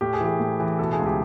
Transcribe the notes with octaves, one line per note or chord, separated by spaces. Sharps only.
A2 G4
G#4
E3
G4
A2
E3
B2 A4
G#4
C#2
G4